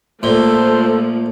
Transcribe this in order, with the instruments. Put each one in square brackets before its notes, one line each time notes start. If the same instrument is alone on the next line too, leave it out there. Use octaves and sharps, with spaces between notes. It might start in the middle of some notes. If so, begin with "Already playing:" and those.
[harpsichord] A#2 [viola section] F3 A3 [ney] A4 [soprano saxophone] C5